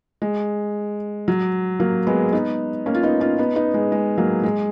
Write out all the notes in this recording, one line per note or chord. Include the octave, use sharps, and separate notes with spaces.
G#3
F#3
F#3 A#3
G#3 B3
B3 D#4
A#3 C#4
F4
B3 D#4
C#4 F4
B3 D#4
B3 D#4
G#3
G#3
F#3 A#3
G#3